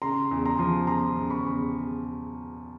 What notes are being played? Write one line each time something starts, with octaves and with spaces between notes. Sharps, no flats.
C#3 A#5 C6
E2
A#5 C6
F3
E2 A#5 C6
C#3
B5 C#6
E2